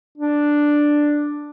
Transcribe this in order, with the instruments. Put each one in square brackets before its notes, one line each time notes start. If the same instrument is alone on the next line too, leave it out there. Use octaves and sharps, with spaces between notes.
[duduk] D4